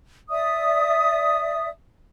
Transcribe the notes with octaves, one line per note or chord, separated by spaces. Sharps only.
D5 E5 D#6